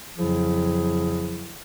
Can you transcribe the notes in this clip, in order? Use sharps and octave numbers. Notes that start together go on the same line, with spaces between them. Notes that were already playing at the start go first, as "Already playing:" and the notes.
F2 C#3 F3 F#3 E4 G#4